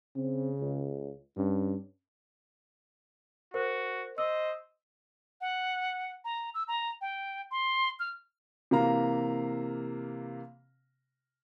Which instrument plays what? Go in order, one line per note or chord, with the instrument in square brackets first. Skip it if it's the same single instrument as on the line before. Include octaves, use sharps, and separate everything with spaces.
[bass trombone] C#3 [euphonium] C4
[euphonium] C#2
[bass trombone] G2 [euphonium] C#4
[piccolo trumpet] F#4 [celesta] A#4 C5
[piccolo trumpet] C5 [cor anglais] D#5 [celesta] E6
[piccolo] F#5
A#5
E6
A#5
G5
C6
F6
[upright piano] C3 E3 A#3 F5 A#5